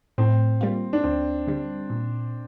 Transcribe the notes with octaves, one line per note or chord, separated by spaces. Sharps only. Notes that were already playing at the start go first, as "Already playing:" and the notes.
A2 C4
G3 A#3 F4
D4
D2 C4
D3 G3
A#2